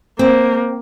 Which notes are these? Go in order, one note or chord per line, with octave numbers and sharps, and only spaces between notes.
A#3 C4